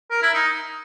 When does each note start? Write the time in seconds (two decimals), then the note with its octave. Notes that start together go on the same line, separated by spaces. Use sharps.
0.11 A#4
0.22 E4
0.34 D#4